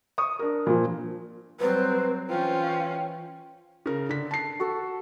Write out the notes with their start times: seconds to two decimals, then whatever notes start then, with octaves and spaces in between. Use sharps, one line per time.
0.18 C#6 D#6
0.39 D4 A#4
0.66 A#2 F3
1.60 F#3 G3 C4 B4 C5
2.29 E3 C#4 F4 C5 G5
3.86 C#3 A#4
4.09 D3 B6
4.31 A5 C7
4.60 F#4 A4